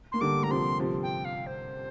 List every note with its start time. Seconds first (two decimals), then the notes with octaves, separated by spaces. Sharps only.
0.12 A#3 C6
0.21 D3 G3 D6
0.43 G3 A#5
0.50 C3 F3 C6
0.80 C3 F3
1.03 G5
1.25 F5
1.47 C5